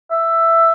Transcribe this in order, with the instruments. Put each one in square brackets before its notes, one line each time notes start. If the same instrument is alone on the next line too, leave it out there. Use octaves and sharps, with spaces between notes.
[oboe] E5